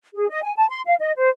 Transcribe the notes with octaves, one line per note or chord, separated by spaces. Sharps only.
G#4
D#5
G#5
A5
C6
F5
D#5
C5